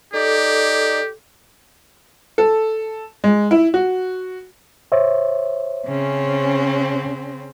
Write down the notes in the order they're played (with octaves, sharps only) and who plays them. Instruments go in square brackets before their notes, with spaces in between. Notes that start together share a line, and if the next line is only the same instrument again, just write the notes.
[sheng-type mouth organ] D#4 D5 [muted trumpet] G4 [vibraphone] A4
[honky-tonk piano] A4
G#3
E4
F#4
[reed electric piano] C5 C#5 E5
[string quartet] C#3 C4 C#4